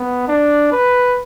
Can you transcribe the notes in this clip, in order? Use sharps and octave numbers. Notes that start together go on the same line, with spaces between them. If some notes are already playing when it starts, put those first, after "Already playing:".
Already playing: B3
D4
B4